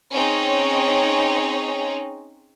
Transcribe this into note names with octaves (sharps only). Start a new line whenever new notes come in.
C4 C#4 D#4 G#4 C#5